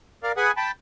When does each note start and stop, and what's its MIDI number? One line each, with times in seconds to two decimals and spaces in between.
0.23 0.32 70
0.23 0.32 74
0.23 0.32 77
0.37 0.52 68
0.37 0.52 71
0.37 0.52 78
0.37 0.52 80
0.57 0.71 79
0.57 0.71 81
0.57 0.71 83